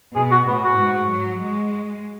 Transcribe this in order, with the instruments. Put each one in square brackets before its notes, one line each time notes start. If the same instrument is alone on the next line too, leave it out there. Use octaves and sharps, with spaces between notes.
[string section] B2 [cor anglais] G#4
[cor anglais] F#4
[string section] A2 [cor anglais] B3
[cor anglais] F#4
[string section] G#2
F#3
G#3